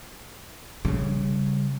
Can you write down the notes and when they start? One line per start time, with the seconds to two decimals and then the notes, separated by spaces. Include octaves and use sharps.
0.85 C#3 G3